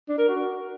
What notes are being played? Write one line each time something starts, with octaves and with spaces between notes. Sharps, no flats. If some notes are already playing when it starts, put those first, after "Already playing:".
D4
A#4
F#4